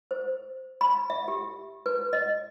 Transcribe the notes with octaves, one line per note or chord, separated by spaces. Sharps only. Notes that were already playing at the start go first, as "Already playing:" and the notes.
C5
B5
E5
G4
B4
D#5